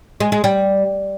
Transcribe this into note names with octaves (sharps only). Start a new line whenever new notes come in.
G#3
G#3
G3